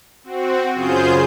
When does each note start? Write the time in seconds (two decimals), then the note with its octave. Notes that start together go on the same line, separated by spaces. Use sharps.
0.24 C4 F#4
0.73 F#2 C#3 F4 G#4 C5 G6